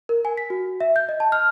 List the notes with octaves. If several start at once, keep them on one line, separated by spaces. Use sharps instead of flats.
A#4
G#5
B6
F#4
E5
G6
D#5
A5
F6